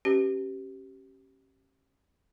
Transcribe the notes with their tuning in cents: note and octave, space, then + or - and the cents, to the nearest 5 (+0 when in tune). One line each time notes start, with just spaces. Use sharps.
C#4 -30 G4 -20 B4 +0